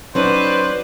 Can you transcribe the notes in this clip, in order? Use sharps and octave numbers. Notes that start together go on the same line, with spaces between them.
F#3 C#4 D#4 B4 C5 D5